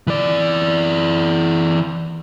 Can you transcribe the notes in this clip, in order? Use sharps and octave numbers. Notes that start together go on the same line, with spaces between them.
E3 D5